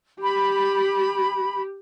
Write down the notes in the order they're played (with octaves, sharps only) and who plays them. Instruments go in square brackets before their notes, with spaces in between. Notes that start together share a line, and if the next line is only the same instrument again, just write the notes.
[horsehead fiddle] G4 [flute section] B5